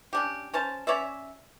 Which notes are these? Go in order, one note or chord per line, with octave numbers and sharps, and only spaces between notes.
C#4 D4 G4
C#4 C5 A5
C#4 C#5 D5 E5